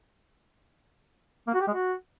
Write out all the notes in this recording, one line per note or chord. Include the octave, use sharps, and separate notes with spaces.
A#3
F#4
G4
G#3
F#4